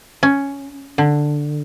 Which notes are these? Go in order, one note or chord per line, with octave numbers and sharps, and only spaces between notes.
C#4
D3